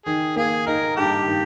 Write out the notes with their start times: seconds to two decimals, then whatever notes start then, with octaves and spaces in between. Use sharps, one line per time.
0.06 D#3 G#4
0.36 A#3 G#4
0.67 D#4 A#4
0.97 G2 G4
1.27 D#3